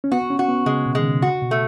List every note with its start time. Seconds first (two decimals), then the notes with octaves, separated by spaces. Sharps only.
0.04 C#4
0.12 B3 F#4
0.30 C#4
0.39 F#4
0.49 B3
0.66 C#3 G#3
0.86 B2
0.95 D#3 G#3
1.04 C#3
1.16 B2
1.22 C#3 F#4
1.42 B2
1.51 A3